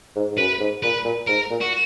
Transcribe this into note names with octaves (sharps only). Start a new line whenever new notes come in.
G#2
G#2
F#2 B4
G#2
A#2 B4
A#2
G#2 A#4
A#2
F#4